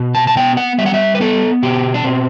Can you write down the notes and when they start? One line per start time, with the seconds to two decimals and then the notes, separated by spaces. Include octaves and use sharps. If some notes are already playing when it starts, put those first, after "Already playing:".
Already playing: B2
0.15 A5
0.27 A5
0.37 B3 G5
0.57 F#5
0.78 G3 E5
0.86 F#5
0.94 E5
1.15 B4
1.20 B3 A4
1.63 B2 G4
1.94 D4
2.04 B2 C4